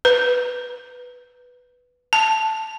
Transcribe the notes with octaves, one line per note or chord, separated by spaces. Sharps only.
B4
A5